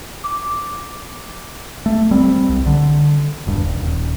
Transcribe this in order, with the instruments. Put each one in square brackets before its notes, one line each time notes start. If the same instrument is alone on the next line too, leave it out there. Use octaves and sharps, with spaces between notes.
[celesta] D6
[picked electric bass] A3
G3 C4
C2
D3
E1 G2
D#1